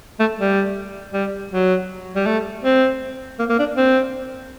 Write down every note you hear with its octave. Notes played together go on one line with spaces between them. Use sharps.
A3
G3
G3
F#3
G3
A3
C4
A#3
A#3
D4
C4